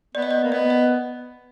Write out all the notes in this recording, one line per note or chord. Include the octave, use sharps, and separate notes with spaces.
B3 D5
D#5
D5
A#3
B3 D#5
D#5